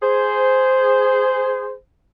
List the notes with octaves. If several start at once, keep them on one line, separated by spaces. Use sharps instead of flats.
G#4 C5